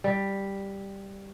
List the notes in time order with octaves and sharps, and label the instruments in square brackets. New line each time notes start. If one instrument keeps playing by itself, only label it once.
[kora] G3